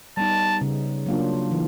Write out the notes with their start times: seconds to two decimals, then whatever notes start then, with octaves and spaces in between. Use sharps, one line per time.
0.17 G3 B3 D#4 A5
0.61 C#3
1.06 F#3 A#3 D4 F4
1.51 E3